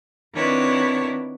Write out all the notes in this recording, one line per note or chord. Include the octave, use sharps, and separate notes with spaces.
D#3 B3 C4 D4 E4 C#5